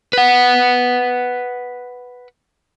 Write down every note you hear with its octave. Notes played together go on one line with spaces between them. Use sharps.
B4 F#5